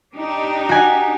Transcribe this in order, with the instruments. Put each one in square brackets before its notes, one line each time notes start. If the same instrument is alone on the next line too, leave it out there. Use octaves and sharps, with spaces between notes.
[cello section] D4 D#4 G4
[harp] F#4 G#5